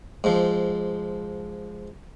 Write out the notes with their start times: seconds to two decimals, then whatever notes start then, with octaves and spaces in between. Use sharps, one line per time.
0.24 G#2 F3